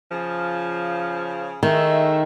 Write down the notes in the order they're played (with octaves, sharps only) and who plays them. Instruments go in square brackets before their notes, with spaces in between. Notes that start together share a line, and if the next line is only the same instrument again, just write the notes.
[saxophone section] C#3 F3
[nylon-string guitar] D#3 [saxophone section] G#3 A3 E5